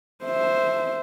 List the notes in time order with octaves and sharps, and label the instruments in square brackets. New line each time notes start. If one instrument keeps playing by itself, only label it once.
[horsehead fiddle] C5 E5